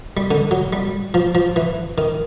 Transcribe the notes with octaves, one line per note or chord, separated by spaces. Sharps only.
G3
D3
F#3
G3
F3
F3
E3
D#3